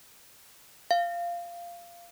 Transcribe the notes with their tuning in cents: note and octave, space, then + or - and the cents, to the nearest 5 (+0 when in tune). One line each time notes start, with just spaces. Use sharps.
F5 -15